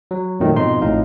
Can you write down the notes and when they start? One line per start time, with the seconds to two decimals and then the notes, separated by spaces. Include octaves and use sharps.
0.11 F#3
0.40 F2 A#2 D#3 F#3 A3
0.55 F2 G#2 B2 D#4 C6
0.82 A1 F2 A2 D#4 F5